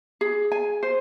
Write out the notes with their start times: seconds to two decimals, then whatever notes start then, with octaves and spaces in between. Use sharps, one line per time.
0.21 G#4
0.52 G#5
0.83 C5